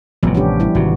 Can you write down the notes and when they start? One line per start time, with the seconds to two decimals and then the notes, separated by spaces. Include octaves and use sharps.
0.23 A1 C3 F3 G3 B3
0.34 C#4 D4 G4
0.60 E3 G3 E4
0.75 G#1 C3 F#4